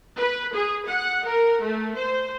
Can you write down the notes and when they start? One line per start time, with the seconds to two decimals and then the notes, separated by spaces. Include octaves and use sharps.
0.17 B4
0.54 G#4
0.87 F#5
1.26 A#4
1.61 A3
1.97 C5